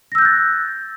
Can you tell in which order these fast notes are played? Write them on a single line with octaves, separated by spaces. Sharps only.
A#6 E6 G6 F#6 A6